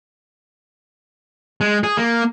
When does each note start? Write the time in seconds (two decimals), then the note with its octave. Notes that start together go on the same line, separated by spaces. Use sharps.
1.61 G#3
1.84 G#4
1.97 A#3